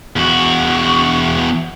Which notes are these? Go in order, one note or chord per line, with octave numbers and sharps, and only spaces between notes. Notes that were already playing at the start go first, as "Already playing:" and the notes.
E2 F#4